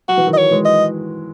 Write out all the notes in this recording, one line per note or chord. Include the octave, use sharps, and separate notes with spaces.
F#3 F#4
E3
D#3 F#3
D#5
C#5
E3 G#3
D#5